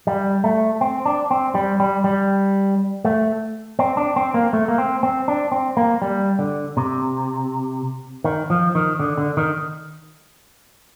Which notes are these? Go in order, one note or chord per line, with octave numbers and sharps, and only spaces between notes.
G3
A3
C4
D4
C4
G3
G3
G3
A3
C4
D4
C4
A#3
A3
A#3
C4
C4
D4
C4
A#3
G3
D3
C3
D#3
F3
D#3
D3
D3
D#3